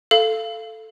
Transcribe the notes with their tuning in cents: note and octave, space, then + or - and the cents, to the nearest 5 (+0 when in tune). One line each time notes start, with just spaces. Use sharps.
A4 +0 F5 -20